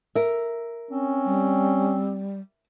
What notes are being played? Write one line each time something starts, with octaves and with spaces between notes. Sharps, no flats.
A#4 E5
C4 C#4
G3